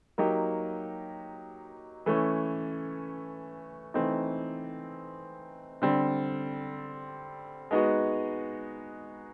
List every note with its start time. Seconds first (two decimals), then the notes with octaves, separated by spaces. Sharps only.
0.18 F#3 A#3 D#4 G4
2.06 E3 A3 C#4
3.94 E3 A3 C4 D#4
5.82 D3 G3 C4
7.71 G#3 B3 D#4 F#4